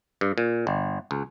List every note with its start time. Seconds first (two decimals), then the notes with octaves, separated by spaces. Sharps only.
0.21 G2
0.38 A#2
0.67 G1
1.11 C#2